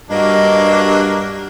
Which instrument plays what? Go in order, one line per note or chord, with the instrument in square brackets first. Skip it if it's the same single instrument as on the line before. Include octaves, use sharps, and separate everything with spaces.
[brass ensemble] G2 [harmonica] F#3 A#3 D4 [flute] D#5